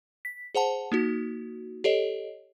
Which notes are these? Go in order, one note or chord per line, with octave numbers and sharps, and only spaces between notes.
B6
G#4 C5 F#5 A5
A#3 D#4 F#4
G4 A4 C#5 D#5